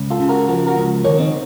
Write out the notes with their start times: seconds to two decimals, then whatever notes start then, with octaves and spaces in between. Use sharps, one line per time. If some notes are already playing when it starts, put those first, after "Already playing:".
Already playing: C#2
0.11 F4 A4
0.20 C#3
0.29 F#4 A#4
0.48 F3 F#4 A#4
0.67 F#4 A#4
0.77 C#2
1.04 D#3 A#4 C#5
1.19 C4 D#4